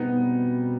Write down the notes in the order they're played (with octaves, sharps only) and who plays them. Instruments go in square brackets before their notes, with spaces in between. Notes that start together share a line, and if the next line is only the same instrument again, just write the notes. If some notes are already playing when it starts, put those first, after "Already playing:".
Already playing: [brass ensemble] B2 G3 C4 [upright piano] B3 D#4